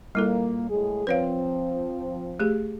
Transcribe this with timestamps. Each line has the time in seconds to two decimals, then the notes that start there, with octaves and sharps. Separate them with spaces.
0.15 A#2 G3 A#3 E4 A4
0.69 A2 G#3 G#4
1.07 F3 C4 B4 C#5 F5
2.40 A3 G4 G#4